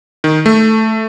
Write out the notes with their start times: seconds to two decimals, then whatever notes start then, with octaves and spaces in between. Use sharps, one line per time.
0.24 D#3
0.46 A3